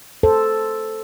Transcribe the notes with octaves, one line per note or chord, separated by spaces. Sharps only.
A4 C5